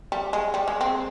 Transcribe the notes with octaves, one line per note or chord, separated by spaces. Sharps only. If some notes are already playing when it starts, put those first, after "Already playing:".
G3
G#3
G3
G#3
C4